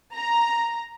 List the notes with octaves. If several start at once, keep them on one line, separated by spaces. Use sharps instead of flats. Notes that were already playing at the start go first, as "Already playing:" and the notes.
A#5